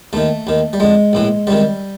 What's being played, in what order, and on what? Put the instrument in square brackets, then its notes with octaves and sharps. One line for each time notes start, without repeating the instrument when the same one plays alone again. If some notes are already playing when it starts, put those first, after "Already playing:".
[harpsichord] D#2 D#3 A3
D#2 D#3
G3
F2 D3 G#3
A#1 A2 E3
C#2 C3 D#3 G3